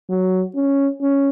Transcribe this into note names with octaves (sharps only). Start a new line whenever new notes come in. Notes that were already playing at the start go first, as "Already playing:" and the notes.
F#3
C#4
C#4